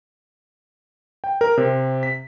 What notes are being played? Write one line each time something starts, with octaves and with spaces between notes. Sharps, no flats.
G5
A#4
C3
B6